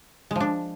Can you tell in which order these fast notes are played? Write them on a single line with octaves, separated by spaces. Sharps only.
G#3 F3 D4